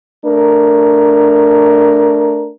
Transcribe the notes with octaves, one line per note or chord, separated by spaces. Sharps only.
A3 D4 A#4